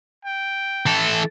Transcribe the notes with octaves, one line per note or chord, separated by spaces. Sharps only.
G5
E3 A4